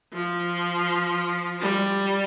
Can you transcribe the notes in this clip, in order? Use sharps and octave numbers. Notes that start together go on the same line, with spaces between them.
F3
G3